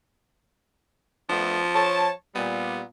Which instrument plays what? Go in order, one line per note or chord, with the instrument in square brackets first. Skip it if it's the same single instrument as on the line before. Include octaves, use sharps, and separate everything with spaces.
[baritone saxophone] F3 [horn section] A3 B3 D4
[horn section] C#5 A5
[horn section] A#2 G3 [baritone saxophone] B3